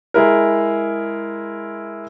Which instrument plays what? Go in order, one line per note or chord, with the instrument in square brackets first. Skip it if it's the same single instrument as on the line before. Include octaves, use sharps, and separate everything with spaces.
[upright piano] G#3 E4 A#4